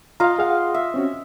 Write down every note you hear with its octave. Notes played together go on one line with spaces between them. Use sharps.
F4 D#5 F5 A#5
G#4 F5 F#5
E5
C4 C#4 F#4